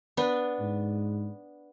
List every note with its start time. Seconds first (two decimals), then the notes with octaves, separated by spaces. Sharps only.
0.17 B3 D4 B4
0.60 G#2